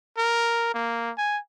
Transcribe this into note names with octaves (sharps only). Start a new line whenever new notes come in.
A#4
A#3
G#5